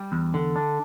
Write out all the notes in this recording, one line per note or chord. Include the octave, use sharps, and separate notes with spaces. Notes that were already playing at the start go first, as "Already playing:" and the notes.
Already playing: G3
E2
D3
D4